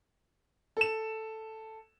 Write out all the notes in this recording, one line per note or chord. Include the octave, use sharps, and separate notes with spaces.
A4 E7